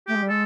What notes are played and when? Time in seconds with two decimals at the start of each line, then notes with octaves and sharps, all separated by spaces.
0.07 A3 G4
0.15 G#3
0.23 G3
0.29 G#3 A4